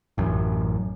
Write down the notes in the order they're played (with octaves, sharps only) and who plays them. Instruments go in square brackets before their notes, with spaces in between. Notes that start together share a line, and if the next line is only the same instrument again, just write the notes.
[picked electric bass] A1 F#2